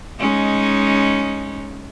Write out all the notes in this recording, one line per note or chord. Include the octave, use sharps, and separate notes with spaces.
G#3 C#4 D#4